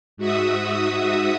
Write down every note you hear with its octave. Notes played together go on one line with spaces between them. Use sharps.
G#2 F#4 E5 D#6